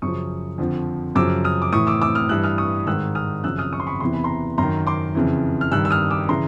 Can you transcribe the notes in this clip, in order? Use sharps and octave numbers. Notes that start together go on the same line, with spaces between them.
F#2 C#3 F3 C#6 D#6
F2 D3 F3
F#2 C#3 F3 D6 E6
D#6 F6
D6
A2 E3 C#6 D#6
D6 E6
D6 E6
D#6 F6
G2 E3 E6 F#6
D#6 F6
C#6 D#6
G#2 D#3 E6 F#6
D#6 F6
F#2 C#3 F3 E6 F#6
D#6 F6
C#6 D#6
C6
B5 C#6
E2 C3 E3 C6
B5
A#5 C6
F#2 D#3 A#5 C6
C6 D6
F2 C#3 E3
F6
G2 D#3 E6 F#6
E6
D#6 F6
D6 E6
C#3 E3 A#5 C6